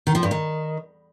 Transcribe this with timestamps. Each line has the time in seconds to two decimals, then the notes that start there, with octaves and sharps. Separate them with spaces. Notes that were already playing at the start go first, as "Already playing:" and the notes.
0.07 D#3
0.15 F3
0.23 G2
0.31 D#3